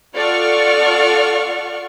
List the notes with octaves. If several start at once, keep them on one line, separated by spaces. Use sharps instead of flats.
F4 A4 D5 F#5 C#6 F6